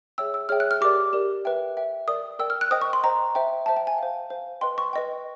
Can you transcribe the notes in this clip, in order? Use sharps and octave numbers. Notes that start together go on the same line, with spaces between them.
G#4 C#5 E5 G5 E6
E6
G#4 C#5 E5 G5 F6
F#6
F6
G4 A#4 D5 D6
G4 A#4 D5
B4 E5 G5
B4 E5 G5
A#4 D5 G5 D#6
A#4 D5 G5 E6
F6
F#6
C5 D#5 G5 D#6
C#6
C6
C5 D#5 G5 A#5
C5 E5 G5
C5 E5 G5 A5
G5
G#5
C5 F5
C5 F5
B4 D#5 G5 C6
C#6
B4 D#5 G5